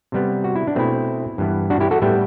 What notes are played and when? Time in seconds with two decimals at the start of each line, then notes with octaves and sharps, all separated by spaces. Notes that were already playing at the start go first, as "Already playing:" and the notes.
0.12 C3 G3 B3
0.44 F#4
0.56 E4
0.67 D4
0.75 B2 A3 C4 E4
1.38 G2 E3 B3
1.70 D4 F#4
1.80 E4 G4
1.91 F#4 A4
2.02 A2 G3 B3 E5 G5